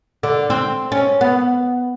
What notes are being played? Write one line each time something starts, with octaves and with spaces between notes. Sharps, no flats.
D3
C4
C#4
B3